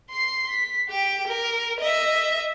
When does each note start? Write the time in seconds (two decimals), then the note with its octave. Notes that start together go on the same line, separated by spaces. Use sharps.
0.11 C6 C7
0.49 B6
0.89 G4 G5
1.27 A#4
1.81 D#5 E5